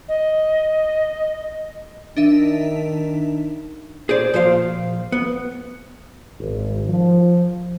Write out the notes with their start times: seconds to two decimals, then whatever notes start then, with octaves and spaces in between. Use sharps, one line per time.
0.08 D#5
2.16 D#3 D4 D#4 E5
4.09 G#4 C5 D5
4.34 A#2 F3 C5 F5
5.12 B3
6.39 G#1
6.89 F3